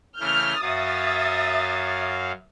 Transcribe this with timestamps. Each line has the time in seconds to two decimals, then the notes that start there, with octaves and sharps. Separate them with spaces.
0.20 C#3 E3 A3 F6 G6
0.62 F#2 F#3 E5 F5 D#6 A6